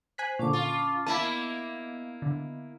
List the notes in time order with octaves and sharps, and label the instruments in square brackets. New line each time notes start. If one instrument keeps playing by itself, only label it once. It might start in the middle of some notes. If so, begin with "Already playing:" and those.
[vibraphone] C5 [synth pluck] G#5 F#6 B6
[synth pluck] A#2 D3 [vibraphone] C#4 A5 D6
[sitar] F4
[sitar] A#3 E4 [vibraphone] B3 D#5 [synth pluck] A5 B5
[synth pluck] D3